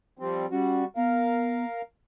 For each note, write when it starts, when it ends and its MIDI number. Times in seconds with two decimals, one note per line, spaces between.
0.19 0.46 53
0.19 0.46 55
0.19 0.46 60
0.51 0.85 55
0.51 0.83 61
0.51 0.85 66
0.96 1.64 59
0.96 1.82 70
0.96 1.82 77